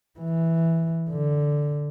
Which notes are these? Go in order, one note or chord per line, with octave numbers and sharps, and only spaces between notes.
E3
D3